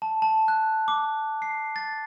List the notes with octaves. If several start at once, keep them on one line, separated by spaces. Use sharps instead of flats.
A5
A5
F#6
D6
C7
A6